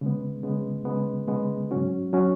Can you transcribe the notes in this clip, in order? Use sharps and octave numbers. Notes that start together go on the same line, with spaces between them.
C#3 G#3 B3
C#3 G#3 B3
C#3 G#3 B3
C#3 G#3 B3
G#2 F#3 C#4 F#4
F#3 C#4 F#4